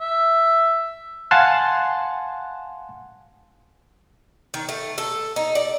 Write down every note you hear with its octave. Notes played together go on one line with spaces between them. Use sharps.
E5
F5 F#5 G#5 A5 C6 F#6
D#3
A3
A4
D#4
D5